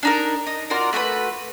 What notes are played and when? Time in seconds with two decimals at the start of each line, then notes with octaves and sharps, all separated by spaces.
0.03 D4 D#4 A#4
0.47 D#4
0.70 F4 F#4 A#4 D5
0.93 A3 F#4 A#4 B4